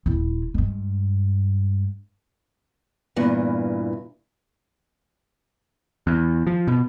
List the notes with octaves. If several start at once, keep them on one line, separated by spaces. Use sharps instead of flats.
D#1 E4
G2 G#3
E2 G2 A#2 E3
E2
F3
B2